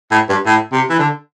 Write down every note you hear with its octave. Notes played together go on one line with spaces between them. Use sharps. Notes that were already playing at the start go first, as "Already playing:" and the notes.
A2
G2
A2
C3
E3
D3